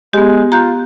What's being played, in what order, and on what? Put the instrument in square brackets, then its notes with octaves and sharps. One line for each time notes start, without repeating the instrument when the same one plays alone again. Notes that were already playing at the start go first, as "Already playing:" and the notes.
[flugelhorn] G#3 [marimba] B3 G4
[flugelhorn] F4 [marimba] A#5 F#6 G6